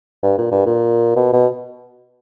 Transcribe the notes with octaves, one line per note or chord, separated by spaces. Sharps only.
G2
A#2
G2
A#2
B2
B2